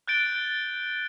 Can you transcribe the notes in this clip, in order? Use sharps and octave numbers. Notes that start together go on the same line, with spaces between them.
F#6 G6 A6 D7 G7